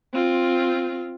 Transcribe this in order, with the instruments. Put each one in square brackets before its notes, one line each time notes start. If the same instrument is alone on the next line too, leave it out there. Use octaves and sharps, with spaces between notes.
[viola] C4 F4